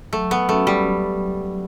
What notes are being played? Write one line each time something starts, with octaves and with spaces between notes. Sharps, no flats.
F#3 A3
B3
A3 C#4 F#4 A4 E5
G3
F#3